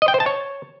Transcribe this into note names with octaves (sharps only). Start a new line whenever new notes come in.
D#5
G5
C5
A5
C#5